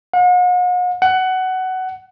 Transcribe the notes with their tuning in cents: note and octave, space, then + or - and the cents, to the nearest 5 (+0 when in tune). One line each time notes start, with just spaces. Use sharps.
F#5 -45
F#5 +15